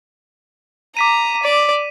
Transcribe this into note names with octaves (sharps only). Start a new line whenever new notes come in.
A#5 D6 B6 D#7
D5